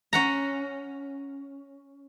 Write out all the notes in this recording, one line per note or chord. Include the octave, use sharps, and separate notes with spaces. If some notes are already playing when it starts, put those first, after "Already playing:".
C#4 F#5 A#5